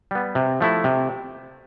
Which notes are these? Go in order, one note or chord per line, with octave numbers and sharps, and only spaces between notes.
G3 B3
C3
F3 A3 E4
C3